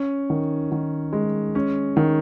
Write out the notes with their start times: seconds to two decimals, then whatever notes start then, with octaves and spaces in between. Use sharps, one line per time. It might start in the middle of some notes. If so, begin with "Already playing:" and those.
Already playing: C#4
0.30 D#3
0.72 D#3
1.13 G#3
1.55 C#4
1.97 D#3